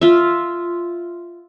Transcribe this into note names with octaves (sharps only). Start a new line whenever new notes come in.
F4 E5